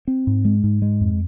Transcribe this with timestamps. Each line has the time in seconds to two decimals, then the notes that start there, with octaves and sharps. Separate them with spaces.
0.08 C4
0.27 G#2
0.45 G#3
0.64 G#2
0.82 G#3
1.01 F2